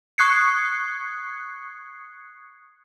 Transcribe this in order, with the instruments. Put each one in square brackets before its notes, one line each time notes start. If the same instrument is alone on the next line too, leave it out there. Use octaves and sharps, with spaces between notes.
[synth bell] C#6 D#6 F#6 G#6 C7 C#7